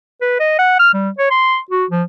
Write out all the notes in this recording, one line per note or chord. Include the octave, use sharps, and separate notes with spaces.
B4
D#5
F#5
F6
G3
C#5
C6
F#4
F3